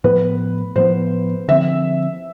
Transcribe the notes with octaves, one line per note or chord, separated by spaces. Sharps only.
A2 F3 B3 B4
A2 F3 B3 C5
D3 F3 C4 E5